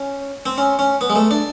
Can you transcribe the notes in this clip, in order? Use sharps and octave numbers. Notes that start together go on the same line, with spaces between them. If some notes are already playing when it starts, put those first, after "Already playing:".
Already playing: C#4
C4
C#4
C#4
B3
G#3
A3
D4